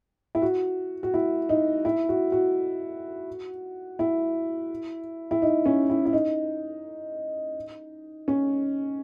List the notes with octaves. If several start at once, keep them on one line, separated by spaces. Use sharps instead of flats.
E4
F#4
F#4
E4
D#4
E4
F#4
F#4
E4
E4
D#4
C#4
E4
E4
D#4
C#4